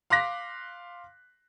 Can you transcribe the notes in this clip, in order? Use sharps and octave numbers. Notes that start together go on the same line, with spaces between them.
F5 C6 D6 F#6 A#6 B6